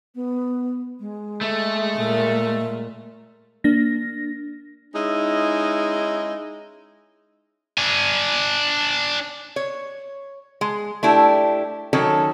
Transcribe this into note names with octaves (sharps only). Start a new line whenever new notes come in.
B3
G#3
A3
A#2
A#3 D4 A#6
G#3 C#4 D#4 E4 D#5
D4 G#5
C#5
G#3
A3 D4 E4 G4
D#3 F#3 C#4 A4